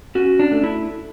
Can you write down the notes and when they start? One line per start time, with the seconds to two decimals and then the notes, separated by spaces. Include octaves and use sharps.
0.15 C#4 F#4
0.39 D4
0.52 A3
0.64 E4